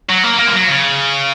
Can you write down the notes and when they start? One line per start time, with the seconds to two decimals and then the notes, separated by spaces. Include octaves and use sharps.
0.09 F#3
0.23 A#3
0.39 A#3
0.48 G#3
0.53 F#3
0.68 C#3